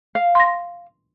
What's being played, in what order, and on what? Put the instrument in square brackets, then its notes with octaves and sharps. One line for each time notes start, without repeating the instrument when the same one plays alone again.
[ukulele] F5
[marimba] C6 A#6